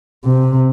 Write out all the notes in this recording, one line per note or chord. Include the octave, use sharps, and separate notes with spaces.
C3